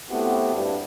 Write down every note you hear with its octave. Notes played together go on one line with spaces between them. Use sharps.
A3 B3 C4 E4 F#4 G4
G2